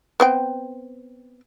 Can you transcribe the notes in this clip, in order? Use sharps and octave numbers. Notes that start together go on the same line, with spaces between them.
B3 C4 G5